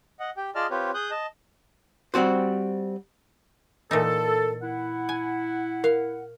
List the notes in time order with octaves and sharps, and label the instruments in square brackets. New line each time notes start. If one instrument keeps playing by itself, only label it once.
[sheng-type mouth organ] D#5 F#5
G4 G5
F4 G#4 D5 D#5 A5 F6
C4 F4 G4 B4 C#5
G#4 D#6 F#6 G6
D#5 A5
[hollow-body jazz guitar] G3 C4 F#4 C5
[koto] A#2 E3 D#4 [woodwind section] A4
[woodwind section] E4 F#5
[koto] G#5
[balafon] A#4 [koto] F5